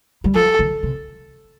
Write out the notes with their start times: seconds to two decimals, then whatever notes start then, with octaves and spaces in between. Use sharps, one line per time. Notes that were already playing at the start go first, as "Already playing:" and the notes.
0.24 G3
0.35 F3 A4
0.59 D#3
0.83 C3